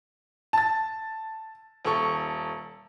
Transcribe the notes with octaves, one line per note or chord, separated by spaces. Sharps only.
A5 A6
D#1 A4 C#6